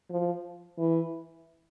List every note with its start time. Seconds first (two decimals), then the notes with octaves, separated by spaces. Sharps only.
0.10 F3
0.78 E3